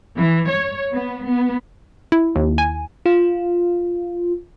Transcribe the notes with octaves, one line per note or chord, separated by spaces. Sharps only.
E3
C#5
B3
B3
E4
D#2
G#5
F4